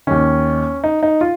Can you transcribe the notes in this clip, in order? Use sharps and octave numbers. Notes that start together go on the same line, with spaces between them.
D#2 D#3 C#4
D#4
D#4
F4